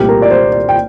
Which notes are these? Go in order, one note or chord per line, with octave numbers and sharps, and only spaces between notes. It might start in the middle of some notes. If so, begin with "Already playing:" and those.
Already playing: C2 A#2 A3 C4 G4
A#4
D5
C5
D5
G5